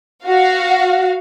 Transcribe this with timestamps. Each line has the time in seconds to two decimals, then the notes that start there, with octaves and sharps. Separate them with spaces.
0.25 F#4 F5